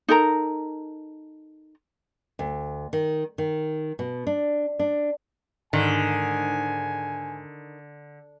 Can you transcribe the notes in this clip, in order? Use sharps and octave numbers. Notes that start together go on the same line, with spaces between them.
D#4 A4 A#4 A#5
D2
D#3
D#3
B2
D4
D4
G#2 D3 D#3 G#5